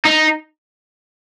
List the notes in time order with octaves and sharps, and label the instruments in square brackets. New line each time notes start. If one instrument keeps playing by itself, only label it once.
[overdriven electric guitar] D#4